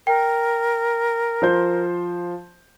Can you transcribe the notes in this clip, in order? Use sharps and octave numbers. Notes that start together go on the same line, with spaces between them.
A#4 G5
F3 C5 G6